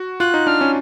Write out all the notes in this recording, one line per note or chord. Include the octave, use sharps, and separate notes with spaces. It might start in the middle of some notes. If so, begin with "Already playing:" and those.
Already playing: F#4
F4 F#6
D#4
D4 F6
C#4